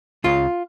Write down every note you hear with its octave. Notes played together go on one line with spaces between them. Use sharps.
C#2 C#3 F4